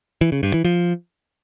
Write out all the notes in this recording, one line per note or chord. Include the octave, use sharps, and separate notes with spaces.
E3
C#3
G2
E3
F3